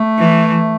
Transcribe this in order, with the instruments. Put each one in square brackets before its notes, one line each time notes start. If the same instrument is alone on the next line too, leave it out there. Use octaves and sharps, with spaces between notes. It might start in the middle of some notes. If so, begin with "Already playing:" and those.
Already playing: [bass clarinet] A3
[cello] E3